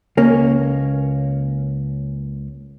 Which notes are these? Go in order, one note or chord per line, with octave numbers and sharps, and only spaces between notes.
C#2 A#3 C#4